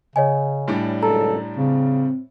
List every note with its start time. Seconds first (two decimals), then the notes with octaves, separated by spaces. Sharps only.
0.16 C#3 C#5 D#5 G#5
0.68 A2 G3 D4
1.03 G#1 C#2 F#2 A4 A#5
1.57 C#3 C4